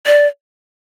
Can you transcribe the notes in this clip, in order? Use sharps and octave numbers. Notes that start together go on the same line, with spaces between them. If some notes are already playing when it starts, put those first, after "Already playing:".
D5